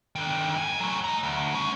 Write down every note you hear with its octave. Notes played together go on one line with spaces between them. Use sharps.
D3 D#3
F#3 G#5
F#3 A3
D#5 A#5
D2
G3 C#4